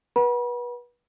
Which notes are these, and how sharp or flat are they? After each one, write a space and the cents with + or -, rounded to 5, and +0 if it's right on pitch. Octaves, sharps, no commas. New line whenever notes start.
B4 -30 F#5 +15 B5 -40